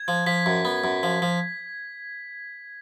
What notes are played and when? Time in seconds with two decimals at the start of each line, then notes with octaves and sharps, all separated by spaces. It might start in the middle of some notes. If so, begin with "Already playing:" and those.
Already playing: G#6
0.08 F3
0.26 F3 B6
0.46 F#2
0.65 B3
0.84 F#2
1.03 F3
1.22 F3